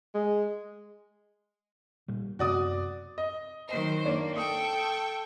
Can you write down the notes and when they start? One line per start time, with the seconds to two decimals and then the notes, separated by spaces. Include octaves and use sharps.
0.15 G#3
2.08 A#2 G3
2.39 F#2 C3 B3 F#4 D5 D#6
3.18 D#5
3.69 D#3 F#3 C5 D#5
4.05 A#3 D4 C#5 D5
4.36 A4 G5 C#6 D#6